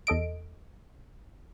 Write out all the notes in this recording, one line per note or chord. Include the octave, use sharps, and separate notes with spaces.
E2 A4 D#5 D7